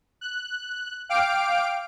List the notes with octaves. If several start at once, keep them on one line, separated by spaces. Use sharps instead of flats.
F#6
F5 G5 D6 F6 D7